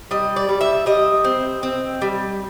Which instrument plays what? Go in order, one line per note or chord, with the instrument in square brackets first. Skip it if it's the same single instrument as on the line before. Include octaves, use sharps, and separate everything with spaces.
[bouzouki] G3 D#5
D5
G3
E5
G3 D#5
C4
C4
G3